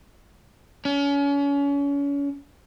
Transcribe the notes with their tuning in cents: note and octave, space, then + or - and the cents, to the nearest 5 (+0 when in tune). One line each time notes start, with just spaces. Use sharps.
C#4 +35